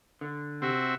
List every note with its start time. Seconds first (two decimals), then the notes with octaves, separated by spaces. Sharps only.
0.21 D3
0.62 C3 C4 F#4 G4 E5